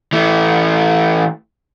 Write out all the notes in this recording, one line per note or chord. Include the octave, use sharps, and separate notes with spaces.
E3 A3